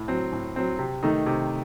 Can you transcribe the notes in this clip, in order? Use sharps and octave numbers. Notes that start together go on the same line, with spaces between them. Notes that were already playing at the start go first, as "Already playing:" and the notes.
Already playing: A2
F#3 C4
A2
F#3 C4
C3
D#3 A3 D#4
C3